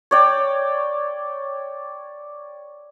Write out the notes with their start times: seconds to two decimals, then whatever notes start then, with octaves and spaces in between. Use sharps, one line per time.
0.11 C#5 D5 G5